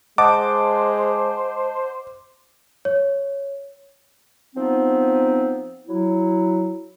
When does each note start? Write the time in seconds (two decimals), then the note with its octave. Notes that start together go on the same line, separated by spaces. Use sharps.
0.18 G#3 C5 D#5 F#5 A5 D6
2.85 C#5
4.56 F3 B3 C4 D#4
5.87 F#3 E4